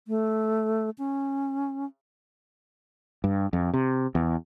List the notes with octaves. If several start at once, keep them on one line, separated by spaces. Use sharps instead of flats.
A3
C#4
G2
F2
C3
E2